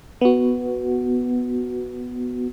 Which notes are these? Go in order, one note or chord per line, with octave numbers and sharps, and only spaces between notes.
B3 F#4